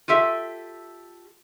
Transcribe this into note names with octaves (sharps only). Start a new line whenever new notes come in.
F4 G4 A4 E5